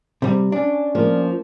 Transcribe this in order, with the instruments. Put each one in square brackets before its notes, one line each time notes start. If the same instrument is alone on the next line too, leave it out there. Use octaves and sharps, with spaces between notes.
[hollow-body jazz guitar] C3 G3
[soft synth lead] C#4 [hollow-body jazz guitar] D4
[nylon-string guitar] F3 A#3